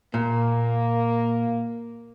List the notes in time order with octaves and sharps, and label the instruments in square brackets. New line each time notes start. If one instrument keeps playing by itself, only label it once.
[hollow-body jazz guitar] A#2 [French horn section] A#3